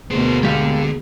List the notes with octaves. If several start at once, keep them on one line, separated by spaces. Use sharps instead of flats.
D2 B2 A#3 B3 G#4 C5
D3 G#3 G4 F5